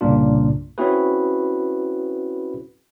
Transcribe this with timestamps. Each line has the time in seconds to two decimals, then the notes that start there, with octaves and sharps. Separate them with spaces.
0.01 C2 G2 A#2 C#3 D4 F4
0.78 C4 C#4 E4 F#4 G#4 B4